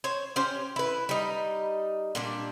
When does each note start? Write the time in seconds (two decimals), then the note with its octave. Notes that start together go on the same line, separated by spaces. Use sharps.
0.04 C5 C#5
0.36 C#4 G4 C5
0.76 E4 B4
1.09 G3 D#4
2.15 A#2 G3 D4